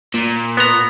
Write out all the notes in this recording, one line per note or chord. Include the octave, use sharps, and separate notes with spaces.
A#2
B3 A#5